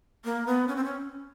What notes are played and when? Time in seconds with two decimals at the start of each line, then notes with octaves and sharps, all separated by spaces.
0.25 A#3
0.47 B3
0.68 C#4
0.76 C4
0.84 C#4